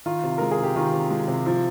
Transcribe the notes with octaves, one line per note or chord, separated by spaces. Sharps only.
D#3 F4
C3
G#3 A#4
G#4
C3
G4
D#3 F4
C3
G#3
C3
F3